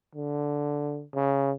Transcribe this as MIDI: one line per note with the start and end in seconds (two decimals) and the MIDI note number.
0.15 1.04 50
1.14 1.53 49